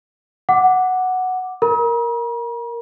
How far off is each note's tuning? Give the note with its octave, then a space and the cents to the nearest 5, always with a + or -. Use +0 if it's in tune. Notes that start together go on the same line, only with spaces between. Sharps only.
F#5 +0 D6 +0
A#4 +0 A#5 +45